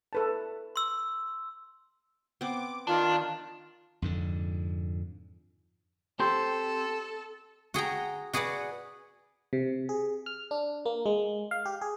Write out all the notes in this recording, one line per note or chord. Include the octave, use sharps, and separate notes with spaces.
A4 B4 A5
C6 E6
B3 C4 D6
D#3 D4 F4
F2 G#2 D3
C4 G4 A4 C5
F#4 G#4 G5 A#5
F#4 G#4 B4 D5 F#5
C3
G#4
F6
D4
A#3
G#3
F5
G4
G#4